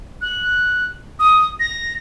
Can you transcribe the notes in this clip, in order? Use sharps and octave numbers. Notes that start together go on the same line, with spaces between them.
F#6
D#6
A#6